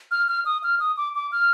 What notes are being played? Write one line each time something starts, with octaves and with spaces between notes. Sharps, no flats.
F6
F6
D#6
F6
D#6
D6
D6
F6